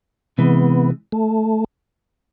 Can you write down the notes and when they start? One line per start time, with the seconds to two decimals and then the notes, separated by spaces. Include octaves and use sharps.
0.38 C3 E3 G#3 B3
1.12 A3